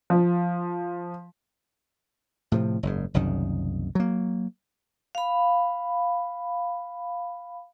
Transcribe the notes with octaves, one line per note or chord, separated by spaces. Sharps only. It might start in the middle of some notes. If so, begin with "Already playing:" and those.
F3
A2 C3 F3
F#1 G#2
F#1 C2 F#2 D#3
F#3 A#3
F5 B5